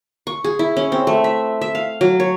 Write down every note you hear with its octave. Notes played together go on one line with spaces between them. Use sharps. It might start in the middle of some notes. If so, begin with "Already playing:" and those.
C#6
G#4
E4
C#4
C4
A3
E5
E5
F5
F#3
C#5